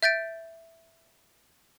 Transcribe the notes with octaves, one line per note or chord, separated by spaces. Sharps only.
E5 G6 A6 D7